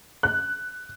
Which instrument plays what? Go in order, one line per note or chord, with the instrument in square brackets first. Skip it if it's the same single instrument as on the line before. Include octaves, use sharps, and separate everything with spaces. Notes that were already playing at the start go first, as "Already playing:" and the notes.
[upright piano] F#6